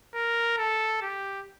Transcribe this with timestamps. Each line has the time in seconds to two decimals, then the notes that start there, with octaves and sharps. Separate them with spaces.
0.15 A#4
0.58 A4
1.02 G4